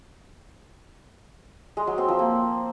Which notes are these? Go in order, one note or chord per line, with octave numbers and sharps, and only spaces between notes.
G#3
F#3
C4
F3
A#3